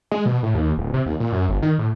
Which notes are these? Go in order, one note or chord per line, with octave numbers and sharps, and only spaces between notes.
G#3
B2
A2
D#2
D1
C3
D#2
A#2
F#2
G1
D#3
A2